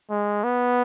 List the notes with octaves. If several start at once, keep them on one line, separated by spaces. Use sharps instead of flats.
G#3
B3